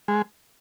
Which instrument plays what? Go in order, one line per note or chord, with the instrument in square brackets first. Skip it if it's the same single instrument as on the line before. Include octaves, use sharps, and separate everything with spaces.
[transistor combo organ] G#3